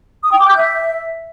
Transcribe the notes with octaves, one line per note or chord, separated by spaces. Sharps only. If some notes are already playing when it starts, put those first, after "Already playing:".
D#6
G5
D6
G6
E5